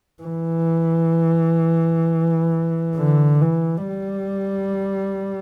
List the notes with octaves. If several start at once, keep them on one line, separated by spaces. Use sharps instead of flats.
E3
D3
E3
G3